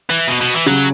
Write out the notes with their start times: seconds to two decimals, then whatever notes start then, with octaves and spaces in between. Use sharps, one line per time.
0.10 E3
0.28 B2
0.41 B2
0.54 E3
0.66 C#3 F#3